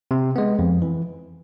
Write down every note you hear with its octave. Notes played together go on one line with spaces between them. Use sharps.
C3
G#3 B3
F2
E3